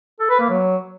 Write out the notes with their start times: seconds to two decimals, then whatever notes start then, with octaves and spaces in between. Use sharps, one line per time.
0.20 A4
0.30 B4
0.40 A#3
0.50 F#3